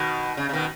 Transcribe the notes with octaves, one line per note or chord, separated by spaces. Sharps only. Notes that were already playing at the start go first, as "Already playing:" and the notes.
Already playing: B2 D#3
C#3
C#3
B2 D#3